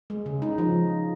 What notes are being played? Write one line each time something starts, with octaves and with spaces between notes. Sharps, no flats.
G#3
C#3
D#4
F3